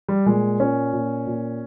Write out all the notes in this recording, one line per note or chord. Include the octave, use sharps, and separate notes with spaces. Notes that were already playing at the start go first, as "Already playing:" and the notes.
G3
A#2 G#3
A#2 C#4
A#2
A#2